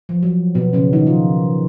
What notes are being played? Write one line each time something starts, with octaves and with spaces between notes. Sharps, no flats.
F3
F#3
B2 B3
C#3 C#4
D#3 D#4
F3 F4